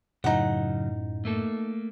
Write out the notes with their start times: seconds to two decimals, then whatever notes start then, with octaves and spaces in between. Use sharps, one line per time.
0.24 F#2 A2 C#3 F#3 D#4 F#5
1.25 A3 A#3 A4